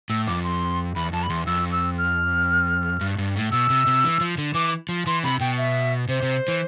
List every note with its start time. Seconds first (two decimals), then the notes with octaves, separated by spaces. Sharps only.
0.10 A2 E6
0.27 F2 D6
0.44 C6
0.96 E2 B5
1.13 F2 A5
1.23 B5
1.30 E2 C6
1.46 F2 E6
1.72 E6
1.98 F6
3.01 G2
3.18 G2
3.36 A2
3.52 B2 E6
3.70 C3
3.87 C3
4.04 E3
4.21 F3
4.38 D3
4.54 E3 D6
4.89 F3
5.07 E3 C6
5.24 C3 B5
5.40 B2 G5
5.57 E5
6.08 C3 C5
6.22 C3
6.48 E3